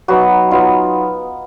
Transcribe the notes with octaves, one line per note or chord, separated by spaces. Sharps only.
F#3 B3 D#4 F#4
F#3 B3 D#4 F4